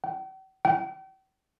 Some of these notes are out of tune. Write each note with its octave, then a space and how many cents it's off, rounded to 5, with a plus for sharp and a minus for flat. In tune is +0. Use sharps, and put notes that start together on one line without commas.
G5 -45
G5 -40